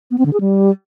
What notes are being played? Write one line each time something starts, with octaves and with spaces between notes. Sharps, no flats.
B3
C4
D3
G#4
G3